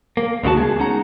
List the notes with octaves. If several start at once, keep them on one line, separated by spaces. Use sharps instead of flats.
A#3
D2 C#3 E4 F#4 A5
G#3 B3 G#4
C#4 D#4 F#5 A#5